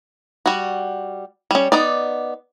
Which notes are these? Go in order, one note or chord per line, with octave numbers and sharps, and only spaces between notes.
G3 F#4
G3 C#4
B3 D#4 D5